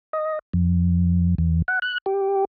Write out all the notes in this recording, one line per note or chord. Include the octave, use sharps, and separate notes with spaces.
D#5
F2
E2
F#5
F#6
G4